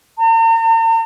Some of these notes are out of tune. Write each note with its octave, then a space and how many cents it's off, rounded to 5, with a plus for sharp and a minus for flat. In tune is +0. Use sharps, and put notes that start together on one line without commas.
A#5 -45